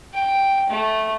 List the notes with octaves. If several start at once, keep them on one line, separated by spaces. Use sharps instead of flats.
G5
A3